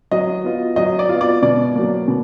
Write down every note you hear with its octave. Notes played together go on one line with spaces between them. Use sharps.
F#3 D#5
B3 F4
F#3 D#5
D5
B3 F4
D5
B2 D5
F#3 A#3
B2